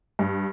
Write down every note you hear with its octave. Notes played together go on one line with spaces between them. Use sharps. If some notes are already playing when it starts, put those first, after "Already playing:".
G2